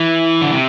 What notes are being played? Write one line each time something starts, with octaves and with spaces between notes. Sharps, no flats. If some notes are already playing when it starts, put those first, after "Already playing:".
Already playing: E3
D3
C3